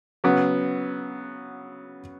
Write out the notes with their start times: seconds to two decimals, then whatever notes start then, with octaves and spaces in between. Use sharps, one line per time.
0.24 C#3 F#3 B3